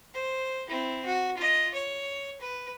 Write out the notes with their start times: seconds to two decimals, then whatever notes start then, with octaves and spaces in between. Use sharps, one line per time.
0.14 C5
0.68 C4 E4
1.05 F#4
1.37 F4 D#5
1.74 C#5
2.41 B4